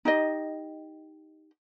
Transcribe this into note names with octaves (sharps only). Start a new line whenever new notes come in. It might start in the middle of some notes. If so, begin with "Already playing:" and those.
D#4 G4 D#5